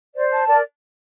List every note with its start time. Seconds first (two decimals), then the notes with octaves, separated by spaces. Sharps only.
0.15 C5 D5
0.32 A5
0.47 A#4 D5